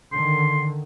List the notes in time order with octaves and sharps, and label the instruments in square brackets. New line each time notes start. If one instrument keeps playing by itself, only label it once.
[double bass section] D3 D#3 [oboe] C6